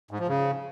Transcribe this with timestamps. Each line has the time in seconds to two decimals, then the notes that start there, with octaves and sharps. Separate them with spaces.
0.11 G#2
0.19 F3
0.28 C#3